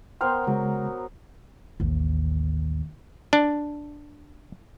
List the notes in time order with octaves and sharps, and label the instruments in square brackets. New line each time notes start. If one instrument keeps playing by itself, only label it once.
[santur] B3 A#4 C5 [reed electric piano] G5 C6 F6
[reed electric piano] C#3 G#3 [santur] F#3
[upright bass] A1 D#2
[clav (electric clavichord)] D4